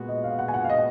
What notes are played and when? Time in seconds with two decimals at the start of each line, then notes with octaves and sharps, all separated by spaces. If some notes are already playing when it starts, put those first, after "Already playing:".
Already playing: A#2 G#3 B3 F#4
0.09 D#5
0.24 F5
0.39 F#5
0.48 G#5
0.54 F#5
0.64 F5
0.69 D#5